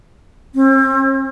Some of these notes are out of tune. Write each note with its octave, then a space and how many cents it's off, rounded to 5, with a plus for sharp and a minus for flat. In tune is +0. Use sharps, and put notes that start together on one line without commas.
C4 +45